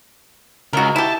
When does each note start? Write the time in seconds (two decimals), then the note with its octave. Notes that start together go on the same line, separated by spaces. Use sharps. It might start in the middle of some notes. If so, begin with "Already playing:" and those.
0.73 C#2 F#4 A#4
0.96 E4 G4 A5